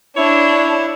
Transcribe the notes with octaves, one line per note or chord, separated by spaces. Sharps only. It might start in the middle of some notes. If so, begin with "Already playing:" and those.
D4 E4 C#5